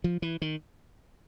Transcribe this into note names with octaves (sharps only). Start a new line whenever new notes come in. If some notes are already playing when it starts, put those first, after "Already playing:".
F3
E3
D#3